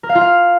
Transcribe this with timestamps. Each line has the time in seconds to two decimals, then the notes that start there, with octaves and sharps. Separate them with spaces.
0.03 A#4
0.09 F5
0.15 F4
0.21 F5